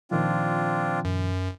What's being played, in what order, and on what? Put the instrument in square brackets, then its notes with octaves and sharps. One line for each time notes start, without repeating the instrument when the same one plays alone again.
[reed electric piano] A#2 D#3 F3 [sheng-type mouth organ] C4 D4 F4
[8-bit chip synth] F#2